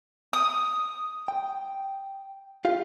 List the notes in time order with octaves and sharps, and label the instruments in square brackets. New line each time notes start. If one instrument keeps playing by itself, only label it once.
[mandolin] D#6
[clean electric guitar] G5
F4 G4 F5